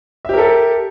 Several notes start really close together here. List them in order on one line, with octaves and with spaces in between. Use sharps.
E5 G4 A#4 A4